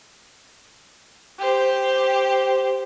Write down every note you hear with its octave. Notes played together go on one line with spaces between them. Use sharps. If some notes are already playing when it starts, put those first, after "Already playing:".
G4 C5